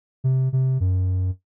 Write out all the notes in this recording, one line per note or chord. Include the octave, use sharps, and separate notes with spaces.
C3
C3
F#2